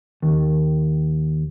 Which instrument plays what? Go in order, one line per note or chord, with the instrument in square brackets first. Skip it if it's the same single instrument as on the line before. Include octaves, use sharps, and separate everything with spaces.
[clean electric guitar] D#2